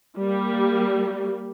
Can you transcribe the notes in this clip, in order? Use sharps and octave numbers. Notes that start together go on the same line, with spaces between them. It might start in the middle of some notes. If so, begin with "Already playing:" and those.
G3 A#3